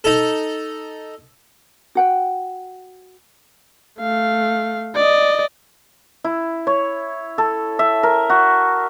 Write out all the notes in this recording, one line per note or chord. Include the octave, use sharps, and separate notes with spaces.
D#4 A4
F#4 F#5 G5
A3 F5
D5 D#5
E4
C#5
A4
E5
A#4
F#4